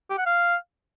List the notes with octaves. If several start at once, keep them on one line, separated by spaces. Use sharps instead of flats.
G4
F#5
F5